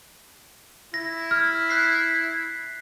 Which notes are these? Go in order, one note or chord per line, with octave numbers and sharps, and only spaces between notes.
E4 A#6
F6
F#6 B6 C7